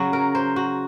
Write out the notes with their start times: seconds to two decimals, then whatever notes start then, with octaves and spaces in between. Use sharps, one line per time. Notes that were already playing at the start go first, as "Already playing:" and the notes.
Already playing: C#3 F#3 F#4
0.13 A#4
0.35 C5
0.56 F#4